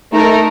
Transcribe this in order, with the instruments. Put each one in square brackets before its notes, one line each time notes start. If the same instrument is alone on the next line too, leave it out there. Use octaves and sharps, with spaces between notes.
[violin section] A3 D#4 A#4